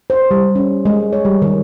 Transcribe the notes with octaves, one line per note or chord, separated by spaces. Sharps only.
C5
G3
C#4
G#3
C#5
G3
D#3